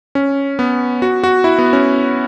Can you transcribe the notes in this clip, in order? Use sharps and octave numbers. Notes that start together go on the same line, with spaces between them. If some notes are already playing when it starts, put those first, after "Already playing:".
C#4
B3
F#4
F#4
E4
B3
C#4